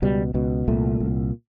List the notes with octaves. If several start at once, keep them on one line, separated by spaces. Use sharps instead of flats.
C#2 B2 G3
C#2 B2
C2 A#2 A3
C2
A#2